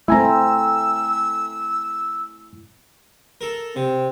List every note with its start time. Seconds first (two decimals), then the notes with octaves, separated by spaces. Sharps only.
0.08 A3 C4 E4 G#5 A#5 E6
3.41 A4 A#4
3.76 C3 C4